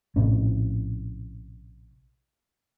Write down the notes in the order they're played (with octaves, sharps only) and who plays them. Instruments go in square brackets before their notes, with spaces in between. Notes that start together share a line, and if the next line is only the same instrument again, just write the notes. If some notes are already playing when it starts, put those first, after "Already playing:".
[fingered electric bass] A#1 A2 C3 C#4